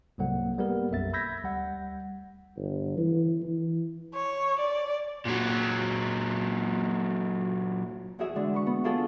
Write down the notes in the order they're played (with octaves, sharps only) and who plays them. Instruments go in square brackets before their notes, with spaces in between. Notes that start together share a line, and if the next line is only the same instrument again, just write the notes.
[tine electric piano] C2 G#2 F#3 A#3 A4 F#5
G3 A#3 B3 G4 A4 A#4
B1 F#2 E5 A6
B5 E6 G6 G#6 A#6 B6
D2 G3 F#5
[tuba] G1
E3
E3
[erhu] C#5
D5
[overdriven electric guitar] A#2 F#3
[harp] E2 E4 F#4 G#4 E5
D3 E3 G#3 D4
B4 C#6
B3
D4 E4 F4 G#4 A4